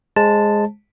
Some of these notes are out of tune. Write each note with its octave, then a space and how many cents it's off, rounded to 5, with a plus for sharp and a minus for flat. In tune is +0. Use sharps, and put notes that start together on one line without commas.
G#3 +0 C5 +30 A5 +0